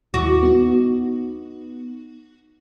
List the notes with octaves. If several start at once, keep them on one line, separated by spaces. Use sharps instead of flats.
D#2 E4 F#4 D6
B3 D#4